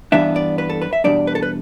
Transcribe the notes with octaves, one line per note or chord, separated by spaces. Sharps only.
G2 E3 G3 B3 D4 E5
D5
B4
A4
B4
E5
E2 B2 G3 D4 D5
B4
A4
B4